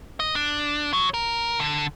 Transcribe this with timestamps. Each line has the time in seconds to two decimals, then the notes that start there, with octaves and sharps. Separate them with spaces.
0.20 D#5
0.35 D4
0.93 F#3
1.14 A#4
1.60 D3